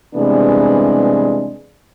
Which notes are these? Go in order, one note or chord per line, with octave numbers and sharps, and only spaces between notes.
C3 E3 G3 G#3 B3 D4